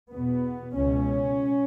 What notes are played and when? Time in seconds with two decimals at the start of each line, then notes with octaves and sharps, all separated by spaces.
0.10 E2 B2 B3
0.74 C#2 B2 C#4